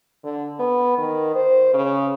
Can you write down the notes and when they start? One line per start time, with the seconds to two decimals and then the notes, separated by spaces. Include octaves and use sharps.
0.24 D3
0.59 B3
0.98 D#3
1.35 C5
1.74 C#3